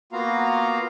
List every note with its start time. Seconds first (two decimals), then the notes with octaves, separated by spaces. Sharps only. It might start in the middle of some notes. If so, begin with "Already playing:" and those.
0.12 A#3 B3 F4 F#4 F5 A#5